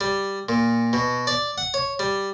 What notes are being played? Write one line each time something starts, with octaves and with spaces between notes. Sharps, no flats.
G3
A#2
B2
D5
F#5
C#5
G3